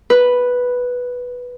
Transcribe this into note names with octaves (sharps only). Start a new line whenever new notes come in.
B4